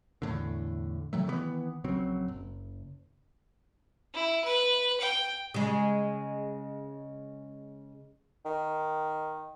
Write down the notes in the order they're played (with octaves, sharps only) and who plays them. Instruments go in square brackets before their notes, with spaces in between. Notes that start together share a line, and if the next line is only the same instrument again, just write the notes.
[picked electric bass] E2 A2 D3
C3 D#3 F#3 A3
D#3 E3 G3 B3
A#1 C#3 F#3 C4
F#1
[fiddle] E4
B4
G5
[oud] C#3 G#3
[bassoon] D#3